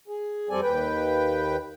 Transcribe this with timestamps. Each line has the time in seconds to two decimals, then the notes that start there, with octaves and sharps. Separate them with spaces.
0.08 G#4
0.49 F2 G3 C4 A4 D5 G#5
0.62 D#2 B4 G5